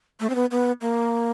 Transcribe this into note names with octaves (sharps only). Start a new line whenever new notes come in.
A3
C4
B3
B3
A#3